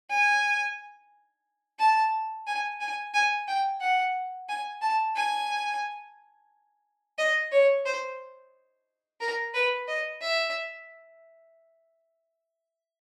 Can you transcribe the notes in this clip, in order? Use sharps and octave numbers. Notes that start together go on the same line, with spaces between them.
G#5
A5
G#5
G#5
G#5
G5
F#5
G#5
A5
G#5
D#5
C#5
C5
A#4
B4
D#5
E5